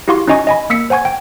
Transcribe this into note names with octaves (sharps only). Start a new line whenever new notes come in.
E4 F#4 G4 F5 C6 C#6
C#4 D#4 F#4 D#5 G#5 C#6
D#5 G#5 B5
A#3 E6 B6 C#7
C5 F#5 G#5 C#6 G#6
G5